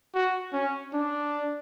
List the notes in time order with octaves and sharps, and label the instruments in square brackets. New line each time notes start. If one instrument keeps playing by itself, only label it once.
[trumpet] F#4
C#4
D4